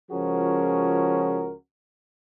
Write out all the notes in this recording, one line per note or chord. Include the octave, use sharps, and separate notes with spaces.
C#2 F3 C#4 F#4 G#4 A#4